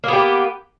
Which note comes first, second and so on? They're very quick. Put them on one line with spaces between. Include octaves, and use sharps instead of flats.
A#3 B3 G4